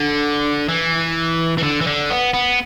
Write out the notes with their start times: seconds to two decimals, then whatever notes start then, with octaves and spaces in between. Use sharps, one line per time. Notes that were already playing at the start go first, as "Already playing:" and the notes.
Already playing: D3
0.68 E3
1.58 E3
1.63 D3
1.81 E3
1.87 D3
2.10 B3
2.34 B3